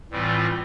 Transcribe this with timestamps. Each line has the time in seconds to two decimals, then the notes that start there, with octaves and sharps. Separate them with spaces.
0.11 A2 E3 G3 C4 F4